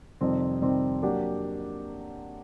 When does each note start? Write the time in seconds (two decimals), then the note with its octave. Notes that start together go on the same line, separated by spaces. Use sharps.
0.21 F2 C3 D#3 G3 C4
0.62 F2 C3 D#3 G3 C4
1.02 F#3 A#3 D4 G4